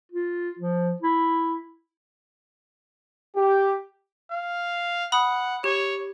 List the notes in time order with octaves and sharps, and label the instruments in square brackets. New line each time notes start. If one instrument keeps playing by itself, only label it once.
[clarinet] F4
F3
E4
[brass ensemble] G4
[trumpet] F5
[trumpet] F#5 [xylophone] B5 D#6
[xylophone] G4 [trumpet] C#5